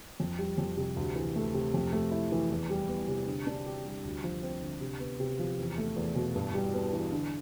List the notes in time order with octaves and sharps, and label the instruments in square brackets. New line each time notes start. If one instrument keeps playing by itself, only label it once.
[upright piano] F2
G3
F2
C3
D2
E3
A3
C3
F2
A3
E4
E3
E2
G3
B3
C3
D3
D4
G4
G3
D2
F3
C4
D3
C3
B3
C3
F3
E2
A3
E2
B2
G2
G3
B3
E3
D3